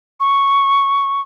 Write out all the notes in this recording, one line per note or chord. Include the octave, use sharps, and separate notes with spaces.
C#6